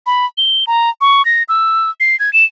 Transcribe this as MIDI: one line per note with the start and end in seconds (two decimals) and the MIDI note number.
0.06 0.26 83
0.38 0.65 103
0.67 0.90 82
1.01 1.25 85
1.25 1.43 94
1.49 1.90 88
2.00 2.18 96
2.20 2.32 92
2.33 2.45 100